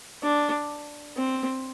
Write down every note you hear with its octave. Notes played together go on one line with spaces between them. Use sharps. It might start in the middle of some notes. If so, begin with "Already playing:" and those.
D4
C4